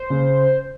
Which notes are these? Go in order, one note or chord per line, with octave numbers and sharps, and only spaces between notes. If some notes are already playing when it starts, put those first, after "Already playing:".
Already playing: C5
C#3